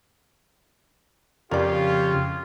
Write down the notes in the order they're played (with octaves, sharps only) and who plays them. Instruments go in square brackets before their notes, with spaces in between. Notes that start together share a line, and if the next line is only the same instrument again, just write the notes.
[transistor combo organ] F2 C#3 [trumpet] F4 [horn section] G4 [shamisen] A#4 D5